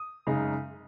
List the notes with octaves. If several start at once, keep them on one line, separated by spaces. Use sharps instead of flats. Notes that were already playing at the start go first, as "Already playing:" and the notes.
Already playing: D#6
F#2 C#3 G#3 D#4